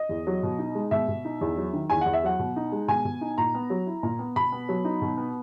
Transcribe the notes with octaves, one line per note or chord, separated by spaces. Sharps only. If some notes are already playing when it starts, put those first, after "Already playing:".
Already playing: D#5
E2
F#3
B2
D#4
G#3
B2 E5
B2
D#4
E2
F#3
D#3
E2 G#5
E2 F#5
E5
F#3 F#5
B2
D#4
G#3
B2 G#5
B2
D#4
A#2 A#5
B3
F#3
E4
A#2
B3
B2 B5
B3
F#3
D#4
B2
B3